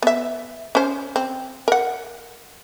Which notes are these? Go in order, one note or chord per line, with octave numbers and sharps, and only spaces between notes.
B3 E5
C#4 C5
C4
A#4 F#5